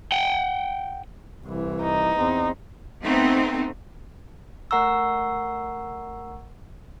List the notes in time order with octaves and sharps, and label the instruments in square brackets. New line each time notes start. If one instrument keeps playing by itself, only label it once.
[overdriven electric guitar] F#5 G5
[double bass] C2 E3
[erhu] D#4
[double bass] E2 C4
[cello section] A3 B3 C4 D#4
[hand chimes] A3 A#4 F#5 A#5 C#6 E6